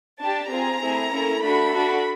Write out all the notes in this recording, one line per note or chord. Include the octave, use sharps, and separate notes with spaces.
D4 G4 A5
C4 F4 G#4 A#5
A3 C4 E4 G#4
A#3 C#4 E4 A4
A3 D4 F#4 B5
D4 F#4 A4